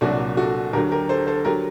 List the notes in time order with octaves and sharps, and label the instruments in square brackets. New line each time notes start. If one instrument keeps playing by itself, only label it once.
[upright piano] C2 A#2 F#3 D4 F#4
F#4 A4
D2 D3 F#3 G4 A#4
G4 A#4
A4 C5
A4 C5
D3 F#3 G4 A#4